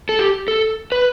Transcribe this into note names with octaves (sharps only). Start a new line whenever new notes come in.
A4
G4
A4
B4